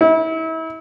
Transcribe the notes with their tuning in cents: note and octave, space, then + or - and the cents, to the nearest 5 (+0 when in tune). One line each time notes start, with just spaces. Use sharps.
E4 -35